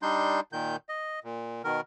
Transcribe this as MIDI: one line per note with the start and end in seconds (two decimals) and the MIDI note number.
0.02 0.40 55
0.02 0.40 62
0.02 0.40 63
0.02 0.40 84
0.02 0.40 91
0.53 0.76 46
0.53 0.76 51
0.53 0.76 91
0.89 1.20 75
1.24 1.62 46
1.64 1.81 47
1.64 1.81 51
1.64 1.81 70